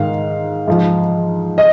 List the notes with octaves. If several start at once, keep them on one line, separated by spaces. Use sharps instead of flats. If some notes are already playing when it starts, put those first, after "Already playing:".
Already playing: G#2 D#3 F5
G#2 F3
D#5